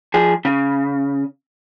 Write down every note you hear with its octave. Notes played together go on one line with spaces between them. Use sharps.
F3 G#4
C#3